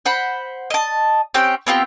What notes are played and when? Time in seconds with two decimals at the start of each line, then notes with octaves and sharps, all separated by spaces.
0.05 C5 F#5 B5
0.70 D#5 A5
1.34 C4 C#4 G4 G5
1.67 B3 C4 F4 G4